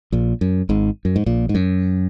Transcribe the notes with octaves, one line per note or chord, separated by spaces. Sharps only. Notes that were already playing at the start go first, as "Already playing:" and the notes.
A#1 A#2
F#2
G#1 G#2
F#2
G#2
A#1 A#2
G#2
F#2